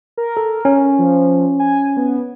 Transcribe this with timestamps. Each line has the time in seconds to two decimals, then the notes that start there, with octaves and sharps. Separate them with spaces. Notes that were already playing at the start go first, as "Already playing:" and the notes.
0.17 A#4
0.37 A4
0.65 C#4
0.99 F3
1.60 G#5
1.97 B3